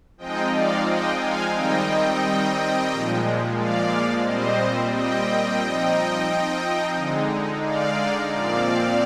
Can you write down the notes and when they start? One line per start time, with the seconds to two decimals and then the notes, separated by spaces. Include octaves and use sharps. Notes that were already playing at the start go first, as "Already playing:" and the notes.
0.18 F3 G#3 C4 D#4 D#5 G5
0.52 D5 F5
0.86 D#5 G5
1.19 F5 G#5
1.53 D#3 G3 C4 D#4 D#5 G5
2.90 A#2 F3 G#3
3.57 D5 F5
4.25 A#2 G3 C4 C5 D#5
4.93 D#5 G5
5.61 F3 C4 D#4
6.96 D3 G#3 D#4
7.65 D5 F5
8.32 A#2 F3 C4 D5 F5